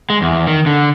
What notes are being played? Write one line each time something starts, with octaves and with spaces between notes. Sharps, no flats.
G#3
E2
D#3
D3